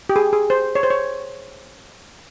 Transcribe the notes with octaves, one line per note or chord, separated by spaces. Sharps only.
G4
G#4
G#4
C5
C#5
C5
C#5